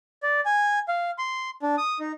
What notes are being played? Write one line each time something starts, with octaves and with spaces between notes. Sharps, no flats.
D5
G#5
F5
C6
D4
D#6
D#4